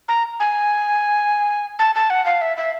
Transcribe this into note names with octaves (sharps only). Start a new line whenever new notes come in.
A#5
G#5
A5
A5
F#5
F5
E5
E5